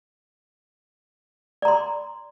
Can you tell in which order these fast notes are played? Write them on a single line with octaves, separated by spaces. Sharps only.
D5 A#5 C6